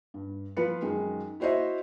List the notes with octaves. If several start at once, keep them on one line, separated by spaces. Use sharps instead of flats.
G2
F3 F4 B4 C#7
F#2 D#3 G#3
E4 F#4 C5 C#5 D#5 E5